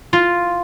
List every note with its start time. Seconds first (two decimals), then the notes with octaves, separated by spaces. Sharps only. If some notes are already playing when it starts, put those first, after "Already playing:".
0.13 F4